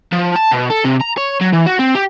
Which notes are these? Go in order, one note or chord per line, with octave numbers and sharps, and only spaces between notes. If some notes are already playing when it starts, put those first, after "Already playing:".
F3
A5
B2
A4
C3
A#5
C#5
F#3
E3
F#4
C4
G4